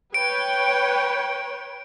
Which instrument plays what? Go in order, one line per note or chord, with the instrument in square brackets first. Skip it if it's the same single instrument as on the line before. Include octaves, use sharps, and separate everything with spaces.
[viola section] B4 C#5 G5 [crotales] D7